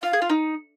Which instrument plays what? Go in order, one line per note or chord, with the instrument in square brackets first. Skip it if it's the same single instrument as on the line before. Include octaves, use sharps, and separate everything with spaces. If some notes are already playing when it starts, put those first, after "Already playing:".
[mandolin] F4 [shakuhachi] F5
[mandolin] G#4
F4
D#4